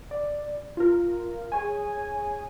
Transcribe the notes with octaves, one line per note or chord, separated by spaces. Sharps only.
D5
F4 A#4
G#4 C#5 G#5